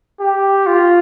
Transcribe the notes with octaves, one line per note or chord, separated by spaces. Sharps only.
G4
F4